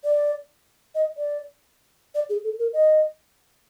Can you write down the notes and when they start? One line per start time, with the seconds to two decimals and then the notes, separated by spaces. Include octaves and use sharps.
0.04 D5
0.95 D#5
1.17 D5
2.15 D5
2.29 G#4
2.44 A4
2.59 A#4
2.73 D#5